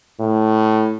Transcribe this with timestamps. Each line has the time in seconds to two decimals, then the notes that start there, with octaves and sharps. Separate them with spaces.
0.20 A2